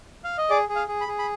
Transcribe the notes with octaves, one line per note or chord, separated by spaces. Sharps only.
F5
D#5
G#4 D5
G#4
F5
G#4
B5
G#4
B5